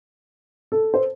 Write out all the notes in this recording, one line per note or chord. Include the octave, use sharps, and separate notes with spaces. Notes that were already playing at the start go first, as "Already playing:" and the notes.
A4
C5